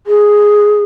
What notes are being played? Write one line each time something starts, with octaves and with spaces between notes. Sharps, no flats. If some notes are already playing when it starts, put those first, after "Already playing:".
G#4